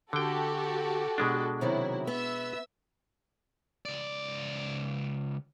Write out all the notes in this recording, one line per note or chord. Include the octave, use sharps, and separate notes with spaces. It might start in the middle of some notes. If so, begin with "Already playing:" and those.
D3 F#4 G4 A4 G5
B2 G#3 D4
C3 D#3 F#3 E4
B3 E5 E6
C#2 D5